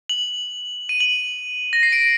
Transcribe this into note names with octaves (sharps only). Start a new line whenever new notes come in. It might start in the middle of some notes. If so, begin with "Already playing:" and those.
F#7
D#7
F#7
A#6
C7
D7